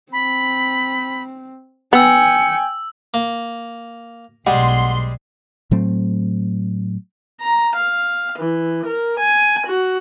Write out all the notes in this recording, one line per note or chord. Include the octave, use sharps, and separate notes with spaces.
C4 B5
B3 G5 G#5 E6 C#7 F#7
A#3
B1 G3 G#3 G#4 F#5 C6
A2 F#3 A3 C4
A#5
F5
E3
A#4
G#5
F#4